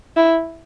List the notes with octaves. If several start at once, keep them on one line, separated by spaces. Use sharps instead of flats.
E4